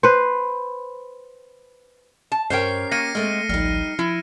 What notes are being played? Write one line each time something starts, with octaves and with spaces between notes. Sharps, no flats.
B4 C5
A5
G2 C#4 G4 A#4 C5 C#5 G5 C7
A#3 C#6 A6 A#6 C#7 D#7
G#3 A3 C4 F6
A1 D2 F3 G3 D#4 F6
F3 E4